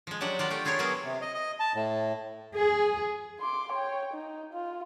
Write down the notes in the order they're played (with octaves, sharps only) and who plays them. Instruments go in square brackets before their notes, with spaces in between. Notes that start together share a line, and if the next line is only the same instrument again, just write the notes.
[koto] F3 G#3
F#3 D4 G4 F#5
F4 G4 A#4 F#5
A3 F4 G5
E4 F4 G#4 A#4 C#5
F#3 A#3 B3 G#4 A#4
[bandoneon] C3
D#5
D#5
A5
A2
[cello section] G#4
[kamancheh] C6 D6
C#5 G5
D#4
F4